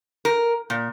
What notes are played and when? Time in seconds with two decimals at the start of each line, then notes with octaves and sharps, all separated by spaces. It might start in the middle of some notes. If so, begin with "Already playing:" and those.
0.25 A#4
0.70 A#2